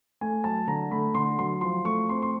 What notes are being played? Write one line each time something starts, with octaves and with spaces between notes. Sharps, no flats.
A3 G#5
F#3 A5
D3 A#5
A3 B5
D3 C6
F#3 C6
F3 C6
A3 C#6
C4 C6
C6